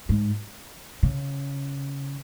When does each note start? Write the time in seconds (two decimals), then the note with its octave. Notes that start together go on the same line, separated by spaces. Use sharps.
0.09 G#2
1.03 C#3